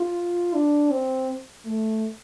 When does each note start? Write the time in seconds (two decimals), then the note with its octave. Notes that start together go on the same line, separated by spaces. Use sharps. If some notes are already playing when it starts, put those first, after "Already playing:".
Already playing: F4
0.54 D4
0.91 C4
1.66 A3